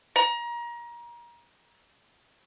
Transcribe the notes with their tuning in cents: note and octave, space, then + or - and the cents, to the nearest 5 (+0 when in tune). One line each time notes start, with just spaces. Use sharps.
A#5 +30